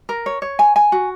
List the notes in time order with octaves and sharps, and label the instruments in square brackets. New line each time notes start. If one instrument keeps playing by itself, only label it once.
[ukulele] A#4
C#5
C#5
G#5
G#5
F#4